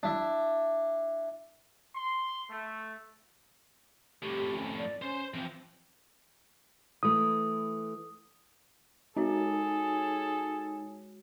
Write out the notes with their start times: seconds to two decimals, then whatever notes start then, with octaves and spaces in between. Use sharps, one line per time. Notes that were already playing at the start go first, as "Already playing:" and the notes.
0.03 D4 E4 E5
1.96 C6
2.50 A3
4.23 F2 A2 G4
4.54 C#4
4.77 D5
5.02 C#4 C5 C6
5.34 E3 F3 C4
7.03 E3 A3 D#6
9.16 G#3 D#4 F#4 G#4 A4 C#5